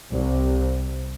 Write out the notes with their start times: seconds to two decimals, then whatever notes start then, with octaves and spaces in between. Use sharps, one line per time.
0.11 C2